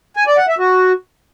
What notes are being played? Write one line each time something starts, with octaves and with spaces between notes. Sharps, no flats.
G#5
D5
F#5
E5
F#4